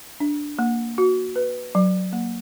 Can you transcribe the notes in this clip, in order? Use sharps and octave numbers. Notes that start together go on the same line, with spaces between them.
D4
A#3
F#4
B4
F#3
A#3